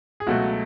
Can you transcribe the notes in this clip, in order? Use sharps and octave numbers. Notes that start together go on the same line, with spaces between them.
G#4
C#2 B2 F#3 A3 F#4